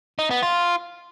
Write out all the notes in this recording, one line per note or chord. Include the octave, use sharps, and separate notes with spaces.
D#4
B3
F4